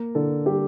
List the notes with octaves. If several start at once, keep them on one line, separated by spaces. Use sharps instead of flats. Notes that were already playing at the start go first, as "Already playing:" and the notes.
Already playing: A#3 A#4
D3 A4
G3 G4